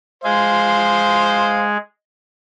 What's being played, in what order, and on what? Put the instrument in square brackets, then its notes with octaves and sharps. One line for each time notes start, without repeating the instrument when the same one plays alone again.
[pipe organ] G#3 G#4 [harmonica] C5 F5